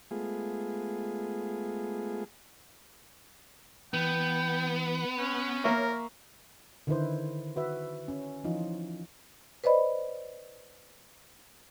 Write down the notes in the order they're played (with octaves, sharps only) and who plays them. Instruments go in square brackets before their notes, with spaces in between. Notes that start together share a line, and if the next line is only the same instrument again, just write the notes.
[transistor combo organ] G#3 A3 B3 F4 G#4
[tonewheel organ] E3 [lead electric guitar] B3 [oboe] G5
[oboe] C#4 [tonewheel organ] F#6
[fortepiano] A#3 E5 C#6 [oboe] A#4 [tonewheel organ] C#5
[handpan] D3 D#3 D#4 E4 B4 C5
F#4 B4 E5
C#4
E3 F3 D#4 F4
[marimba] B4 C5 D5 D#5 B5